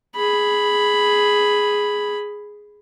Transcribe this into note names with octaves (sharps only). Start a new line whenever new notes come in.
G#4 B5